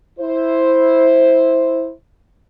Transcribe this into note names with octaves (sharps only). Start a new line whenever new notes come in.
E4 C5